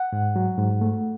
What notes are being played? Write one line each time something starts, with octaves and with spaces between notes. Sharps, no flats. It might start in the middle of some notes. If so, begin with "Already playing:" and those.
Already playing: F#5
G#2
F#3
G#2
A3